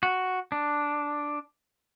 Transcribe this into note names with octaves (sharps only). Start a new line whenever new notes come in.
F#4
D4